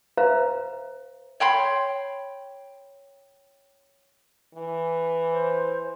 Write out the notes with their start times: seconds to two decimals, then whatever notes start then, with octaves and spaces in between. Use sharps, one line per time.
0.17 B4 C5 E5 F5 A#5
1.40 C#5 G5 B5 C6
4.55 E3
5.31 C5